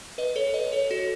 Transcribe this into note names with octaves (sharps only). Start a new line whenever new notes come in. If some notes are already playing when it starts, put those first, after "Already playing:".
B4 D#5
A4 C#5
B4 D#5
A4 C#5
F#4 A4